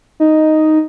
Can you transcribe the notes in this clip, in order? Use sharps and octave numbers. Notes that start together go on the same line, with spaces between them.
D#4